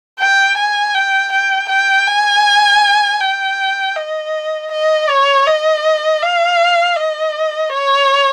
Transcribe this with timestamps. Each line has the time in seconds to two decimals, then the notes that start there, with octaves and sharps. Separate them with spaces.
0.20 G5
0.57 G#5
0.94 G5
1.32 G5
1.69 G5
2.07 G#5
3.20 G5
3.96 D#5
4.72 D#5
5.08 C#5
5.47 D#5
6.22 F5
6.97 D#5
7.73 C#5